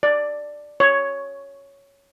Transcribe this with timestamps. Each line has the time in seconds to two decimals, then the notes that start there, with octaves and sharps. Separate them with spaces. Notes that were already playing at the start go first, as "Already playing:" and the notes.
0.03 D5
0.80 C#5